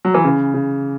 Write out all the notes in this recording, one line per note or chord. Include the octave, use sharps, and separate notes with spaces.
F#3
E3
C#3
C#3